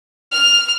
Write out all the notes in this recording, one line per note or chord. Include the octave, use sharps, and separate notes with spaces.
F6